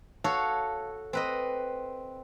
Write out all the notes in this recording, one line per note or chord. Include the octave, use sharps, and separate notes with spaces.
F#4 A4 C#5 F5
C4 B4 D#5